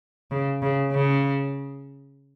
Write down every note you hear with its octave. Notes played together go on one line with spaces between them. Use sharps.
C#3
C#3
C#3